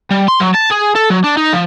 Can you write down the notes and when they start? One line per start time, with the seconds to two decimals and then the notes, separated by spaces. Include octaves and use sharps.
0.11 G3
0.28 C6
0.40 F#3
0.54 A5
0.71 G#4
0.95 A4
1.10 F#3
1.24 D4
1.37 D#4
1.53 F3